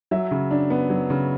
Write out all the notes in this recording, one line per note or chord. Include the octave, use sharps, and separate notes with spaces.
F#3 E5
C#3
D4
B3
F#3
C#3